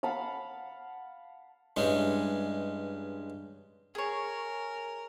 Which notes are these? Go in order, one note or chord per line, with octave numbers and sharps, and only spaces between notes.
F5 F#5 A5 B5
G2 E3 G#3 C#4
G#4 A#4 C#5